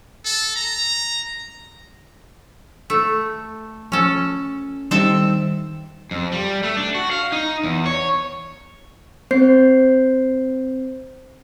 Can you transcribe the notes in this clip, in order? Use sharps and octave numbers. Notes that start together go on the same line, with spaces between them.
A4
A#5
A3
F3 C#4 A4
D#3 G3 C4 D#4 A4 E5
F2
G3
A3
D4
F#4
F5
D#4
E2
C#5
C4 C5 G6 C7